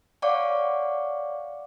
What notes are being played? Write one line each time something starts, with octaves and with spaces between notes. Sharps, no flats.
C#5 D5 F5 F#5 C#6 D6